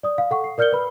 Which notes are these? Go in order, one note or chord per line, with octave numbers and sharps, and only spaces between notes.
D5 D#6
F5
A4 F#5 C#6
C7
A#4 D5 F6 G6 C#7 G7
B4 B5 F6